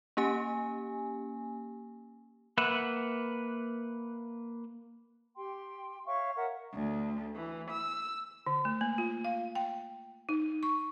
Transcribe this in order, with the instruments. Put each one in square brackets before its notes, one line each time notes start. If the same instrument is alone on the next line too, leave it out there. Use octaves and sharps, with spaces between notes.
[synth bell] A#3 C#4 G4 G#5
[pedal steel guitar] A#3 B4 E5 F#5
[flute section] G4 G5 C6
C#5 E5 F5 C#6
A#4 E5 F#5
[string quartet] D2
E3
E6
[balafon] D3
A3
A#3
F4
F5
G5
D#4
C#6